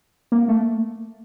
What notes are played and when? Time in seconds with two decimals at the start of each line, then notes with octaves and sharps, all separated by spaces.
0.32 A#3
0.48 A3